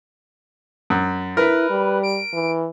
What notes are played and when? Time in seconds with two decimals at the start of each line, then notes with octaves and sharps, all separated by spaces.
0.90 F#2
1.37 E4 A#4 B4
1.70 G3
2.03 D7
2.34 E3